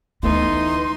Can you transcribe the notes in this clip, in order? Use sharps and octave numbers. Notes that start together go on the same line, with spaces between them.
D2 E3 A3 B3 C#4 D#4 C6